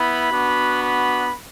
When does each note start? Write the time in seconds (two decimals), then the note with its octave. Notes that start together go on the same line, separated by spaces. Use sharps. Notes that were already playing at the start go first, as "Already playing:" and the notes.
Already playing: B3 E4 B5
0.32 B3 D4 F#4
0.83 B5